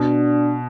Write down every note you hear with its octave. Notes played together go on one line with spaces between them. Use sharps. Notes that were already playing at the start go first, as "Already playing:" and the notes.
Already playing: B2 D4